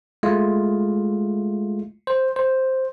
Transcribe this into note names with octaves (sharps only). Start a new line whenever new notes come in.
G#3 A3 E4 F4
C5
C5